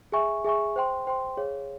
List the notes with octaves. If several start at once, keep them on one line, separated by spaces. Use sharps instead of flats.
G#4 E5 G#5 C#6
G#4 E5 G#5 C#6
C5 G5 C6
C5 G5 C6
G#4 C#5 F5